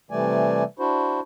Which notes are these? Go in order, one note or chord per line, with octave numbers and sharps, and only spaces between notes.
C3 E3 G3 A3 D5 G#5
D4 E4 F#4 C5